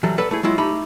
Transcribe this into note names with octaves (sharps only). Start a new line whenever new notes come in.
E3 F#3 G3 A4
A4 B4 D5 F#5
A3 E4 G#4
F#3 G#3 E4 F4
A3 D#4 G4 B5